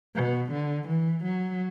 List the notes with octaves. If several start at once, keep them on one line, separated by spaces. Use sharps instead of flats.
B2
D3
E3
F#3